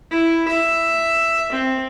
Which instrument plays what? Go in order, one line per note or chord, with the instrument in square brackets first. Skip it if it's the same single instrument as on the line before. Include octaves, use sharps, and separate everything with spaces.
[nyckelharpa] E4
E5
C4